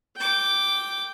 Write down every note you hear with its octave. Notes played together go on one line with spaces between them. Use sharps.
G5 D6